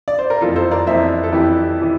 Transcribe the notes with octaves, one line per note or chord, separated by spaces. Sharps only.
D5
C5
A#4
F2 E3 F4 A4
A4 C5
A#4 D5
F2 E3 C5 E5
A4
F2 E3 E4 G4
E3